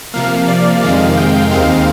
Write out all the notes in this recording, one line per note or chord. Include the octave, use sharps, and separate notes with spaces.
C3 F3 A#3 F5
D5
F2 C3 D#3 G#3 F5
G5
D#2 D#3 G#3 C4 F5